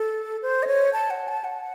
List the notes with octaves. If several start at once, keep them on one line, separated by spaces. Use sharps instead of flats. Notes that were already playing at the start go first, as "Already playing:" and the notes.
Already playing: A4
C5
D#5
C#5
A5
F#5
A5
F#5